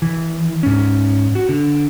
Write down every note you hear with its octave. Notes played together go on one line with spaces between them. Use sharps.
E3
G#2 C#4
F#4
D3